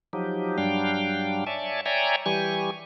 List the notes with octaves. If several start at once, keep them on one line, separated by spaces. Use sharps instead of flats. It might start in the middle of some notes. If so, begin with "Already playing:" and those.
F3 F#3 D#4 G4
G2 F#3 G3 D4 F5 G5
C#5 D5 E5 G#5 A5
C#5 D5 E5 G5 G#5 A#5
E3 G3 G4 G#5 C#6